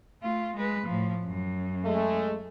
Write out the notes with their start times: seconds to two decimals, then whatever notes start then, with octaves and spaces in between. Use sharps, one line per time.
0.22 A3 F4
0.56 G#3 B4
0.86 A2 F3
1.26 F#2
1.85 G#3 A3